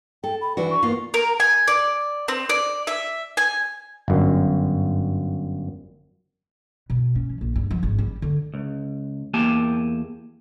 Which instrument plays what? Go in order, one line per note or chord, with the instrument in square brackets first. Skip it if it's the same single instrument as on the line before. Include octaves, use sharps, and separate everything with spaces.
[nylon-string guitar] A4 [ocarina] G5
[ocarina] B5
[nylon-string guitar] E3 D4 F#4 [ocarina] B4
[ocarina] C#6
[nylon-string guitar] A#3 B3 F4
[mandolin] A#4
G#5
D5
C4
D5
E5
G#5
[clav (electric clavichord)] G1 F#2
[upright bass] B2
C#4
E3
A#1
G2
F3
G#1
G3
D3
[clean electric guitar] C#2
E2 A#3 G4 G#5 A5